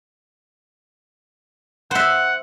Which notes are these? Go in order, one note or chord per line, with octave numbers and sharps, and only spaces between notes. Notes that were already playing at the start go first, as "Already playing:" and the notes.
C5 E5 F#5